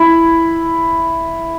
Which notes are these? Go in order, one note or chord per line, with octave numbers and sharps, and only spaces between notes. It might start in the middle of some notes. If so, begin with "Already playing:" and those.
Already playing: E4